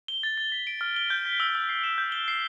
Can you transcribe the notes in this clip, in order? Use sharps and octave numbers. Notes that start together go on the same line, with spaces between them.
G7
A6
A6
B6
D7
F6
G7
G6
B6
E6
E6
C7
E7
G6
G7
C7